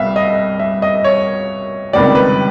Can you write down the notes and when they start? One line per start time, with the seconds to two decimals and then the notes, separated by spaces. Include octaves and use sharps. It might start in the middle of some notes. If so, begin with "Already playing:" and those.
Already playing: C2 B2 G3 B3 E5 F5
0.16 D#5
0.59 E5
0.82 D#5
1.04 C#5
1.93 C#2 C3 D#3 G3 B3 D5
2.15 B4